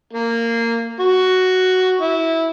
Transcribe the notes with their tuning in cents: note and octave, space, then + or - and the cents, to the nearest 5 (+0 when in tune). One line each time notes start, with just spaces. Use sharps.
A#3 -15
F#4 +5
E4 -15